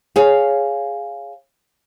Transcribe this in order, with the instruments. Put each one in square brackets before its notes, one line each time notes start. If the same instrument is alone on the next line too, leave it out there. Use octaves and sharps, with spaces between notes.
[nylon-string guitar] G#4 C#5 F5